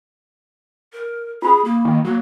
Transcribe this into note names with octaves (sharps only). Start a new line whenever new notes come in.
A#4
F4 G#4 B5 D#6
A#3
D#3
F#3 A#3